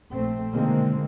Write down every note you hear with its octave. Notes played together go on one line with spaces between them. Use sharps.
A#1 A3 C4
B2 D3 D#3 G#3 A#3 C4